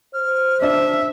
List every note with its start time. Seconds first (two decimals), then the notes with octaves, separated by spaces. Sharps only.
0.14 C5 F6
0.62 D4 E5 A5